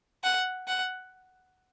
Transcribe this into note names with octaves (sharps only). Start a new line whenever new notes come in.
F#5
F#5